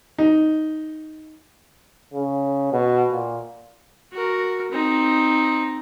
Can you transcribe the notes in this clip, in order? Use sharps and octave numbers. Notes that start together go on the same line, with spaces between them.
D#4
C#3
B2
A#2
F#4 A#4
C4 D#4